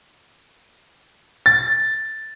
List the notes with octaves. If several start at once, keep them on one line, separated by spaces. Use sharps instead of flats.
A6